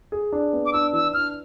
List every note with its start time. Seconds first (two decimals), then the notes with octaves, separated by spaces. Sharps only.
0.12 G#4
0.32 D4
0.53 B3
0.66 D6
0.73 D4 E6
0.93 E3 E6
1.14 D4 F6